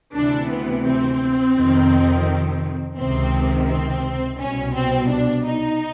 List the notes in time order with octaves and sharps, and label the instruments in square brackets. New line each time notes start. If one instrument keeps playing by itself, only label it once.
[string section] D2 C3 E3 D4
B3
C4
F2 C3 D#3
C#2 C3 D#3 C4
C4
C2 B2 C#4
C4
D4
D#4